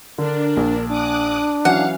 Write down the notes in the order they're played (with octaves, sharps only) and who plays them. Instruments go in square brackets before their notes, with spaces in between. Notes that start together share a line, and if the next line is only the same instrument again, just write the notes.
[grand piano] D3 [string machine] D4 [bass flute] A#4
[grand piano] A#1
[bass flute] D4 [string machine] D6 D#6 F#6
[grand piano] E3 F#3 C#4 [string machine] F5 [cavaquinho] F#5